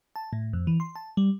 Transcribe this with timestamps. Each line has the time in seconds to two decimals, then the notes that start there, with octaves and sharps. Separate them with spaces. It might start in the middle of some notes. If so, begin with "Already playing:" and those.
0.16 A5
0.33 A2
0.53 F2
0.67 E3
0.80 C6
0.96 A5
1.17 G3